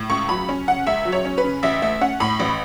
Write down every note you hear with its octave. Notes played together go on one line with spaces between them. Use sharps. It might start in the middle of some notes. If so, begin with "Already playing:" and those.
Already playing: A2
C#2 C#6
F#3 B5
C#4
C#3 F#5
C#2 E5
F#3
C#5
C#4
B4
C#3
A1 E5
A3 E5
C#4 F#5
A2 B5
A1